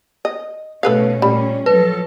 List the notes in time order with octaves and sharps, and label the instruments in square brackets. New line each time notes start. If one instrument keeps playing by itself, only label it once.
[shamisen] D#5
[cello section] B2 A3 C#4 [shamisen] A4 B4 F5
[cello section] A#2 C#4 [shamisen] G3
[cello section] F3 F#3 A4 [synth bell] B4